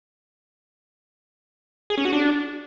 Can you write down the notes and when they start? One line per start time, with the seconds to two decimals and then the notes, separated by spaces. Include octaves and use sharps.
1.90 G#4
1.98 C#4
2.05 F#4
2.13 D4